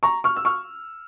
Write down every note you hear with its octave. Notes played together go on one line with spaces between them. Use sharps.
A#5 C#6
C#6 F6
E6
C#6 F6